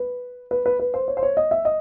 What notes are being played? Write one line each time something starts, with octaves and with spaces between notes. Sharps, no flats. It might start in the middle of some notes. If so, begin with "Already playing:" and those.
Already playing: B4
B4
B4
B4
C5
C#5
C5
C#5
D#5
E5
D#5